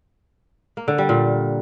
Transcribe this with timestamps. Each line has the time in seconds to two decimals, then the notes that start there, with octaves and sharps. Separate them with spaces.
0.77 A#3
0.88 D3
0.98 G3
1.09 A#2